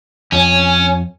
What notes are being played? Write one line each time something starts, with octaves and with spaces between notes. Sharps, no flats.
F2 C#4 C#5 G#5